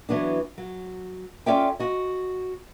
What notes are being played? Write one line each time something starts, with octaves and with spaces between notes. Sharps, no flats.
E3 F#3 B3 D4
F#3
C#4 F4 A4 D5 E5 G5
F#4 D#5